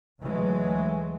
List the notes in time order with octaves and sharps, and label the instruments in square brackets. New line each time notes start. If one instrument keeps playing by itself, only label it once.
[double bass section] D2 E3 F#3 G#3 A3